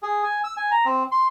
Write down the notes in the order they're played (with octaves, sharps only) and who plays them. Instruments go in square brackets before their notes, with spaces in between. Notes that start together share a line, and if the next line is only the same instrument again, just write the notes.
[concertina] G#4
G#5
E6
G#5
A#5
C4
C6